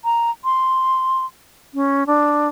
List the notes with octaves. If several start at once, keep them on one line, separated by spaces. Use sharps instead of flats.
A#5
C6
C#4
D4